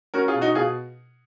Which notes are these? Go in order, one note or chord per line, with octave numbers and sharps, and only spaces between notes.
C#4 F#4 A#4
F4 G#4
B2
D#4 F#4
B2 F4 G#4